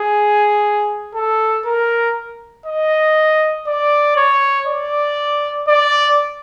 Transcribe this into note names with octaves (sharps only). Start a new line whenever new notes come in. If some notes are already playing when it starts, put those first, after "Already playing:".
Already playing: G#4
A4
A#4
D#5
D5
C#5
D5
D5